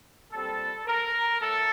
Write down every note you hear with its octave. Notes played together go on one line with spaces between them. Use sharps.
A#2 G3 C4 A4
A#4
A2 A4